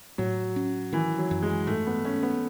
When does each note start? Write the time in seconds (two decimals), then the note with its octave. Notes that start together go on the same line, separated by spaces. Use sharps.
0.18 A2 F#3
0.56 C#4
0.93 D#3 E3
1.18 F#3
1.31 F#2
1.42 G#3
1.67 G#2 A3
1.87 B3
2.05 A3 C#4
2.23 B3